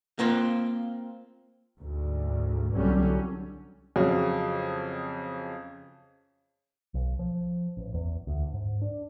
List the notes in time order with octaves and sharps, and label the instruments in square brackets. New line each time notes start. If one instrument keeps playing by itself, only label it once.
[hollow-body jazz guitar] A#3 C4 F4
[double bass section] D2 G#2
C2 D3 F#3 G3 C#4
[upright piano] F2 C#3 F#3
[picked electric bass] B1
F3
A1
E2
D2
G#2
D4